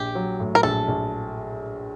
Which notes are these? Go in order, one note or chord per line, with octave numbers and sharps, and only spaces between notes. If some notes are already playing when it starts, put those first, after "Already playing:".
Already playing: A#1 G4
F#3
A2
A#4
A#1 A4
A#1